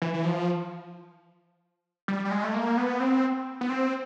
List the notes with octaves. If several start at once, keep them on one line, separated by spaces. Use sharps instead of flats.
E3
E3
F3
G3
G3
G#3
A3
A#3
B3
C4
B3
C4